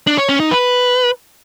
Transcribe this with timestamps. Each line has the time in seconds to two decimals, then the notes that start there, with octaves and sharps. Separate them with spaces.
0.07 D4
0.18 C#5
0.29 C#4
0.40 D#4
0.51 B4